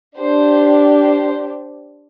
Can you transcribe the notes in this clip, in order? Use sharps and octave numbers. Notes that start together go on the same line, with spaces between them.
D4 G4 C5
C5